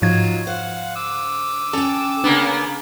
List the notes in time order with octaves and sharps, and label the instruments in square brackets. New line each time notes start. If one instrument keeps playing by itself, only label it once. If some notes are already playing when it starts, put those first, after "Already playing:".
[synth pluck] G#2 F3 G#6 [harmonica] F#3 D#4 F4
[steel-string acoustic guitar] C5 [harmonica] F5 F#5
[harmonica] D6 E6
[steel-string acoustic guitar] C#4 G5 [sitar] A4
[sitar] C#3 A#3 B3 [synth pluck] D4